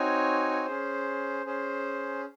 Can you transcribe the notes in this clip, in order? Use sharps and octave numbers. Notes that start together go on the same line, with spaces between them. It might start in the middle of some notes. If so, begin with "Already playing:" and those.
Already playing: C4 D#4 F#4 C#5 G#5
C#4 G#4 C5
C#4 G#4 C5